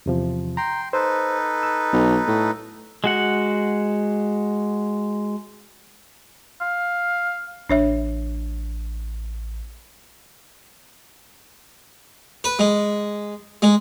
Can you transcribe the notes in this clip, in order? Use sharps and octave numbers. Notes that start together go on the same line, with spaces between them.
E2 C3 F3
G5 A#5 C6
D#4 A4 B4 C5
E6
B1
A2
G#3 F#4 F#5
F5
A1 D4 C#5 E5
B4
G#3
G#3